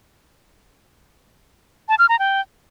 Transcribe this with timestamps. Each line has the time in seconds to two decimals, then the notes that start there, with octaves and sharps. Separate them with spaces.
1.89 A5
1.99 F6
2.09 A#5
2.19 G5